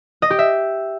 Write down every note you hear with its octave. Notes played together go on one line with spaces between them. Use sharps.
D#5
G4
E5